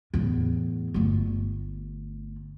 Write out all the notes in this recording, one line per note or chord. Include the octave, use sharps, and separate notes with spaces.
E2 A2
G1 A3